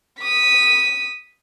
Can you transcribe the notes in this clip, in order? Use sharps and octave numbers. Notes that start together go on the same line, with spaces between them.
D#6 B6